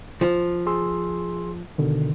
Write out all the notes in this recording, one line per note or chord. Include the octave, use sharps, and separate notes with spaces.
F3
G#4 C6 E6
B2 D3 D#3